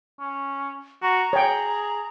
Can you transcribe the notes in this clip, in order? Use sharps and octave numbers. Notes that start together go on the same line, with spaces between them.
C#4
F#4 A#5
G#4 C#5 G5